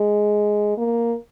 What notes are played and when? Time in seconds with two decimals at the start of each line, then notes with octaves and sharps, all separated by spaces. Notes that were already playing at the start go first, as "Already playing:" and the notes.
Already playing: G#3
0.78 A#3